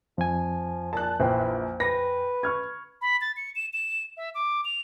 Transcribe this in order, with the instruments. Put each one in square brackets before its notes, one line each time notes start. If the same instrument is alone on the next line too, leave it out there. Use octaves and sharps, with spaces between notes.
[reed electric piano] F2 G#5 [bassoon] F3
[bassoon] A#2 [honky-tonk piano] A5 F#6
[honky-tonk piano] A#1 [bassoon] E3 [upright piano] C5 G5
[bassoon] B4 [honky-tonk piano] A#6
[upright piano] C#6 F6 G#6
[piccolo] B5
A6
C#7
E7
E7
E5
D6
F7